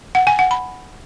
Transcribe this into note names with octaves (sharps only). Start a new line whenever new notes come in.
F#5
G#5
F#5
B5